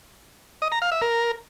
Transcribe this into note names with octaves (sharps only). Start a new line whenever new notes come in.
D#5
A#5
F5
E5
A#4